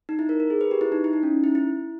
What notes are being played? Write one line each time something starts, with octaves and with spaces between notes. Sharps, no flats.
D#4
E4
A#4
A#4
G#4
B4
G4
E4
D#4
E4
D#4
C#4
E4
E4